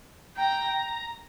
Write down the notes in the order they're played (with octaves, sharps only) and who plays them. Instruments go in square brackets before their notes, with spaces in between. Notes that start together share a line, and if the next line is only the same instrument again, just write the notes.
[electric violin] G5 [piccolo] A#5